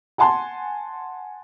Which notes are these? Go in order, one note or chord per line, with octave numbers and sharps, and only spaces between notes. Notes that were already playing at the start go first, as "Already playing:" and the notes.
F#5 G#5 A5 C6